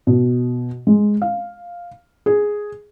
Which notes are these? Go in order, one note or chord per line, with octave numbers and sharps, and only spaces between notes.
B2
G#3
F5
G#4